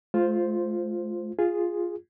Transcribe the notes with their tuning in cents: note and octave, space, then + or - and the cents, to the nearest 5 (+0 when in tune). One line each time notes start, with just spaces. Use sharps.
A3 -45 F4 +0 C5 +0
F4 +0 G#4 -10